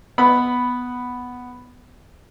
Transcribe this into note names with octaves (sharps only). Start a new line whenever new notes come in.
B3 B5